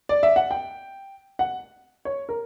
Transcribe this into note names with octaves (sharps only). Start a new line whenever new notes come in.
D5
E5
F#5
G5
F#5
C#5
A#4